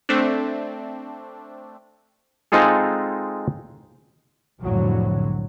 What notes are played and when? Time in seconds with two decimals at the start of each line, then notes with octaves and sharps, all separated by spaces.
0.09 A3 C4 D4
2.52 G#3 C4 D#4 F4 G#4 A4
4.60 C2 F2 A2 D3 F#3